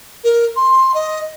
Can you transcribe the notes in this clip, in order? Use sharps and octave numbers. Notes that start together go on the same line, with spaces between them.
A#4
C6
D#5